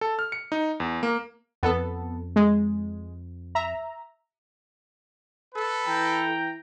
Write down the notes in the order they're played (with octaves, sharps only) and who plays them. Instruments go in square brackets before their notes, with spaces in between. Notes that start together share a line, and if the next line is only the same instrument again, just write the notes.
[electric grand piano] A4
F6
C#7
D#4
E2
A#3
[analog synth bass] F2 [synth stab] B3 A4
[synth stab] G#3
E5 A#5
[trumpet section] A4 B4
[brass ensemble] E3 G5 A#5